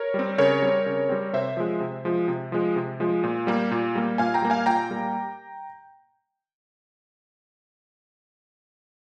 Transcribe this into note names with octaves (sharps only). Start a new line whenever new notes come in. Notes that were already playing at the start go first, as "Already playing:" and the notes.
Already playing: A#4 C#5
G3 C4
C#3 A#4 C#5
G3 C4
C#3
G3 C4
C3 C5 E5
F3 G#3
C3
F3 G#3
C3
F3 G#3
C3
F3 G#3
A#2
G3 A#3
A#2
G3 A#3
A#2 F5 G#5
G5 A#5
G3 A#3
F5 G#5
A#2 G5 A#5
G3 A#3